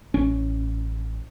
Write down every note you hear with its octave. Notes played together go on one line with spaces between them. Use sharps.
A1 C#4